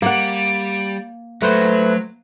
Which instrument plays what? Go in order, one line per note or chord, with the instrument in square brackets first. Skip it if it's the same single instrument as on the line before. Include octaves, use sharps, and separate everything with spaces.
[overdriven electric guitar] G3 [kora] A#3 F#5
[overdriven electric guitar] F#3 [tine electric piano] A3 B4 C5